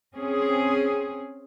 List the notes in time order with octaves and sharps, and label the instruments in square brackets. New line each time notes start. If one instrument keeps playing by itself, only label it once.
[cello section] C4 C#4 G#4